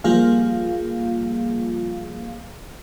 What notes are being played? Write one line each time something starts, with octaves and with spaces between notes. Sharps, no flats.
F3 G3 A#3 F4 G#4 F5